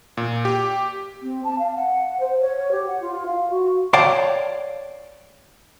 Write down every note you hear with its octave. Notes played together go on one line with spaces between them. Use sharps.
A#2
G4
C4
A5
F5
F#5
C5
C#5
G4
F#5
F4
F5
F#4
C#5 D5 F5 G5 A5